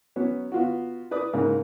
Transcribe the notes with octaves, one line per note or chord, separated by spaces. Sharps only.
F#3 B3 C#4
B3 F4 F#4
B4 D5 D#6
G#2 C#3 A#3